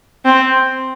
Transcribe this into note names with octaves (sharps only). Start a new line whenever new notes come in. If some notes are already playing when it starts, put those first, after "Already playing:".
C4